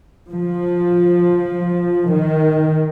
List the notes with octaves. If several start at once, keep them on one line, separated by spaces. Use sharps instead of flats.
F3
D#3